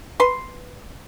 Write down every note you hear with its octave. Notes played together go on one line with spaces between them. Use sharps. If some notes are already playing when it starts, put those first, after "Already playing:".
B4 C6